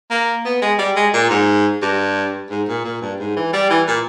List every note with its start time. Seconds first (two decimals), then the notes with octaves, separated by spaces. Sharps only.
0.10 A#3
0.45 B3
0.62 G#3
0.79 G3
0.96 G#3
1.13 A#2
1.30 G#2
1.82 G2
2.50 G#2
2.68 A#2
2.84 A#2
3.01 G2
3.19 G#2
3.36 E3
3.53 G3
3.70 E3
3.87 A#2